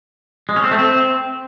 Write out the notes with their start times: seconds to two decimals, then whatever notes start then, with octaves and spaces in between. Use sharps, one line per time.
0.49 G#3
0.56 C#4
0.64 C4
0.71 A3
0.79 C4